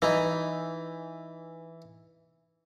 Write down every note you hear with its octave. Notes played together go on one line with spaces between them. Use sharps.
E3 D#4 D#5